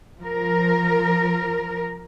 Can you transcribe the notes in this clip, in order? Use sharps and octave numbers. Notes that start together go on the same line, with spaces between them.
F3 A#4